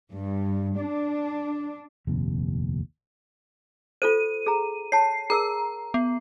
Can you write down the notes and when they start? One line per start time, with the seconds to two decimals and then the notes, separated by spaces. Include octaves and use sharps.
0.13 G2
0.79 D4
2.07 F1 A#1 D#2 C3
4.02 F4 A4 C5 D#7
4.46 G#4 A#5
4.92 C#5 A5 C7
5.30 G#4 A#4 A#5 E6
5.94 B3